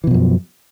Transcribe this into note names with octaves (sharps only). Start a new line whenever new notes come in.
F#2 B2 E3 F3